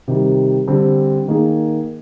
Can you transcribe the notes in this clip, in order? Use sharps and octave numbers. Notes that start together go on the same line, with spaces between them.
C3 D#3 G3
D3 G3 C4
D#3 A#3 D#4 G#4